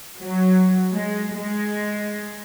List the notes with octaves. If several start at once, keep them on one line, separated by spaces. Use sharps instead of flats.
F#3
G#3
G#3